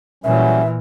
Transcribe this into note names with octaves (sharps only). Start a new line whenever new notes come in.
A#2 E3 F#3 G3 C#4 E5